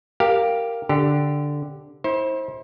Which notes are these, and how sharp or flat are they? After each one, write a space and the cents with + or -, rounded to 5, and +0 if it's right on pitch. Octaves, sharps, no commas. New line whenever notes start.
G4 +0 A#4 -10 F5 +5
D3 +0 G4 +0
E4 -35 C5 +25